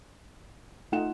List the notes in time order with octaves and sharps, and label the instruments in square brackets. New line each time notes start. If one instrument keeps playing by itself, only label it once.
[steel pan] A3 D#4 [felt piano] F4 F#5 E7